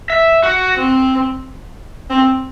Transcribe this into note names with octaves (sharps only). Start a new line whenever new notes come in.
E5
F#4
C4
C4